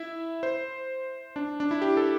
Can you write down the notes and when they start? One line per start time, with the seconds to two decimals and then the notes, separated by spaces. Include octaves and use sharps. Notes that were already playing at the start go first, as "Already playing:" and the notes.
Already playing: E4 E5
0.43 C5
1.36 D4
1.60 D4
1.71 E4
1.82 G4
1.97 A4